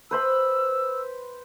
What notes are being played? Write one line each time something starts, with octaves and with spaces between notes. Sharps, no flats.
B4 C5 B5 E6